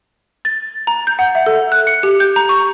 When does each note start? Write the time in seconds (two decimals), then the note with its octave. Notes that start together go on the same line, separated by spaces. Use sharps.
0.45 A6
0.87 A#5
1.07 G6
1.19 F#5
1.35 E5
1.46 A4
1.72 F#6
1.87 C#7
2.03 G4
2.20 G6
2.36 A#5
2.49 C#6